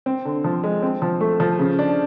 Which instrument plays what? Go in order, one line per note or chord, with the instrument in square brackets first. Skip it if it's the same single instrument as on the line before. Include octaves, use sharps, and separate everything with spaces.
[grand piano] C4
D3
F3
G#3
C4
F3
A3
F3
C#3
D4